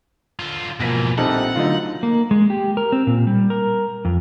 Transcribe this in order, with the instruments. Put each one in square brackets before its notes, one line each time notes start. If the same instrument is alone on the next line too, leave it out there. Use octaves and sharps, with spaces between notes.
[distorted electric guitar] D3 F4
[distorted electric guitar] G#2 E3 [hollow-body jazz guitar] B2 F3 A#3 [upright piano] A#6 B6
[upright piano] A#1 G3 D#4 [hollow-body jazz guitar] C4 A4 [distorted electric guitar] F#5
[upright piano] D3 D#4 [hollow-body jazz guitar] F#3 A3 F4
[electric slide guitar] A#3
G#3
G4
A#4
C4
A#2
G3
A#4
F2